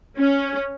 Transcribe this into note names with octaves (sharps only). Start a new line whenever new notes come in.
C#4